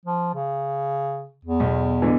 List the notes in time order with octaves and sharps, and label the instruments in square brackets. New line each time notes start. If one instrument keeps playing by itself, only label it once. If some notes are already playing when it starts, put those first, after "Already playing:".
[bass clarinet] F3
C#3
E2
[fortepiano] B1
B2 D3 E3